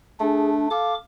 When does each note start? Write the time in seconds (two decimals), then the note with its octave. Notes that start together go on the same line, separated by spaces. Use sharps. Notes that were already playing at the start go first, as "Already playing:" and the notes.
0.20 A3 D4 G#4
0.70 A4 F5 D6